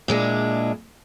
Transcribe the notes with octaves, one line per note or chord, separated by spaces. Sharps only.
A#2 G#3 D4 E4